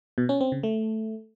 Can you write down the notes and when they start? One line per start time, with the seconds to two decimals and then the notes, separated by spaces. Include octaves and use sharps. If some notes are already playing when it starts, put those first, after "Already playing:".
0.18 B2
0.29 C#4
0.41 C4
0.52 C#3
0.63 A3